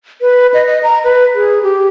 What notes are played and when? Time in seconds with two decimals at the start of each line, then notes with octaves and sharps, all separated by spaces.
0.21 B4
0.54 D#5
0.67 D#5
0.83 A#5
1.04 B4
1.35 G#4
1.63 G4